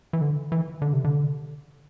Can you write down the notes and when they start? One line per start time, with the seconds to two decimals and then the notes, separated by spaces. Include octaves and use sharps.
0.13 E3
0.21 D3
0.52 E3
0.82 D3
0.93 C3
1.04 D3